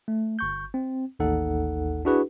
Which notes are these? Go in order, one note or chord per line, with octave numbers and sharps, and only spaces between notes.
A3
G1 C#6 G6
C4
A1 D#2 D#4 A4 F#5
D4 E4 F#4 G#4 B4